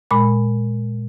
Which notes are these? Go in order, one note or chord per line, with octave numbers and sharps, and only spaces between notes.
A#2 G#3 B5